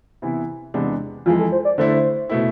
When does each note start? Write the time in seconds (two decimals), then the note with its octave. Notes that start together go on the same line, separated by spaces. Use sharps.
0.22 C3 E3 B3 E4
0.74 E2 C3 G#3 B3 D4
1.26 F2 E3 G#3 F4
1.39 A4
1.52 C5
1.65 D5
1.78 D3 A3 E4 C5
2.30 B2 A3 E4